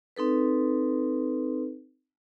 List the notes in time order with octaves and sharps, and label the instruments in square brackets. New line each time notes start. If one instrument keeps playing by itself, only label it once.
[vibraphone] C4 D#4 A4 B4